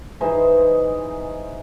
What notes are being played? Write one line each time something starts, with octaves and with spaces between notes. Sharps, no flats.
E3 G#3 D#4 C5